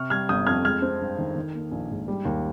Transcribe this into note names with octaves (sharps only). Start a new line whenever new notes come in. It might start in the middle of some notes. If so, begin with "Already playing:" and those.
Already playing: C3 C#6 F6
G3 F6 G#6
G1 D#6 G6
F2 F6 G#6
G#3 F6 G#6
C4
G2
D#3
D#3
A#3
A#1
G#2
G3
D#2